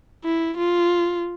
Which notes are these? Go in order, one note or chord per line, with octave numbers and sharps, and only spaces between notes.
E4
F4